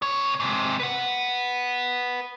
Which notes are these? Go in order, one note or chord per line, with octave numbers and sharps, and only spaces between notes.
C3 C#5
G#2 C3
B4 F#5